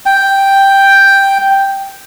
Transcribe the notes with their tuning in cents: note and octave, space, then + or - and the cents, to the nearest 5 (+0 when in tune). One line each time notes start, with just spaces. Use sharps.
G5 +0